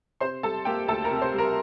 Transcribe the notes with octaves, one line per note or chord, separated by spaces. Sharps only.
C3 C5 C6
G3 A4 A5
A#3 G4 G5
D2 A4 A5
A#4 A#5
C3
C5 C6
G3
A#4 A#5